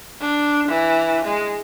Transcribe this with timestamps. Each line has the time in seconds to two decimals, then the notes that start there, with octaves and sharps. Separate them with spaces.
0.21 D4
0.68 E3
1.25 G#3